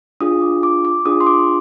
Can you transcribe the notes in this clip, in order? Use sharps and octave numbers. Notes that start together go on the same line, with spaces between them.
D4 F4 G#4 D#6
D6
D6
D6
D4 F4 G#4 D#6
C6
D6